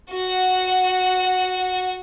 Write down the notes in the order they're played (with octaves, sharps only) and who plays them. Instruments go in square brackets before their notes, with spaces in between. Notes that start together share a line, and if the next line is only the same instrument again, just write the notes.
[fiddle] F#4 F#5